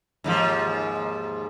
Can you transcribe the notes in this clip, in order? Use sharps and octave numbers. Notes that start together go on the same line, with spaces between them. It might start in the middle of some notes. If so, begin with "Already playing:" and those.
D#2 G#2 F3